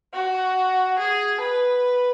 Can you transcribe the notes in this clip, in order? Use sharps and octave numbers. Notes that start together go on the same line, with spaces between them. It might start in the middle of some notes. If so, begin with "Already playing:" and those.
F#4
G#4
B4